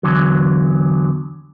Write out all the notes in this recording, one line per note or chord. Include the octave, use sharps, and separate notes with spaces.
E2 G#2 D3 F#3